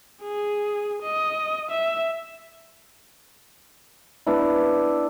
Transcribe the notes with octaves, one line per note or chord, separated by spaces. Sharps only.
G#4
D#5
E5
B3 D4 E4